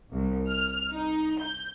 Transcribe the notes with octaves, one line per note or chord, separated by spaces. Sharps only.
C2
F6
D#4
G6